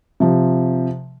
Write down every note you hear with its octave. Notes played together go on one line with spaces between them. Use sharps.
C3 F3